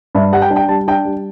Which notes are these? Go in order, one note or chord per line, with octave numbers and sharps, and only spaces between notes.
G2 E5
G3 F#5
G5
D4
G5
G3 A5
D4 G5
G3